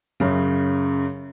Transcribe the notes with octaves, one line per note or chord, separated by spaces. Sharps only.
F#2 C#3